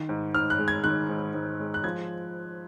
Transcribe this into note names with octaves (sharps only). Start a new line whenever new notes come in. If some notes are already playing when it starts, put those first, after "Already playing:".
Already playing: D#3
G#2
G#2 F6
F#6
G#3
G#6
D#3 F#6
G#2
G#2
G#3
F#6
F3 G#6